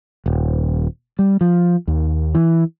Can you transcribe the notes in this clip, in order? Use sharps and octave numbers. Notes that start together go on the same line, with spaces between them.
D#1
G3
F3
D#2
E3